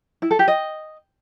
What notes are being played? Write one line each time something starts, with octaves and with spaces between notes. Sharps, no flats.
E4
A4
G4
D#5